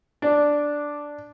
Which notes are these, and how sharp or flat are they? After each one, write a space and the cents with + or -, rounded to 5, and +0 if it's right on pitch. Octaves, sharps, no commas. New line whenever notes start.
D4 +0 D5 -5